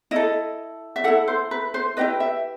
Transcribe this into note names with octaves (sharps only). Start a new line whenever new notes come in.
E4 A4 D#5
E5
E4 A4 F#5
C5
B4
C5
E4 G4 B4 D#5
E5